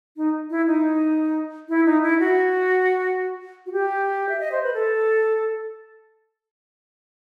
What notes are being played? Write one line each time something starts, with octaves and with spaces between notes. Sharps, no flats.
D#4
E4
D#4
E4
D#4
E4
F#4
F#4
G4
E5
D#5
C5
B4
A4